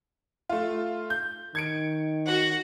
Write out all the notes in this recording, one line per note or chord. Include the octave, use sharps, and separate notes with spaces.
A3 F4
G6
D#3 G#6 C#7 D7
F#4 F#5